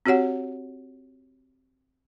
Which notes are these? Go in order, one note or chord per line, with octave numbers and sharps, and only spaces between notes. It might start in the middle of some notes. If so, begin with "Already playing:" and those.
C4 F#4 G4 C#5 F#5